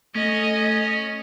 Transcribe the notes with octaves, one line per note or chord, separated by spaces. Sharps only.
A3 C#4 D#5